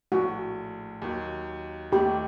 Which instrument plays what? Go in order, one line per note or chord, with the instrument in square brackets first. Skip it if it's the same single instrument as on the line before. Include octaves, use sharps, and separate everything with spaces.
[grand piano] A#1 A2 A3 [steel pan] F#4
[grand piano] D#2 D#3 F#3
[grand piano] D#2 D#3 A3 [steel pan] G4